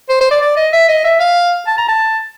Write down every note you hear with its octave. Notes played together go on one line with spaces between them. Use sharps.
C5
C5
D5
D5
D#5
E5
D#5
E5
F5
A5
A#5
A5